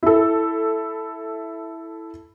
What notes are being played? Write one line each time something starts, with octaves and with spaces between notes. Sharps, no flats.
E4 A4